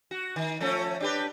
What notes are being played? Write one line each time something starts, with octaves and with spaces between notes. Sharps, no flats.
F#4
D#3
F3 A3 C#4
D4 G4 B4